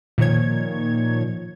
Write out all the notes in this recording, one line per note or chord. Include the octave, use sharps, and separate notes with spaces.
A#2 D#3 F3 C#5 G#6